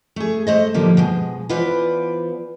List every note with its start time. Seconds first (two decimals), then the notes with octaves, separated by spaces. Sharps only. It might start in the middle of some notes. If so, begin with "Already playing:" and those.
0.16 A3 G#4
0.47 A3 C5 D#5
0.74 A2 D3 F3 G3 A#3 D#4
0.97 B2 F3 G#3
1.49 E3 B3 F4 B4 C5 D5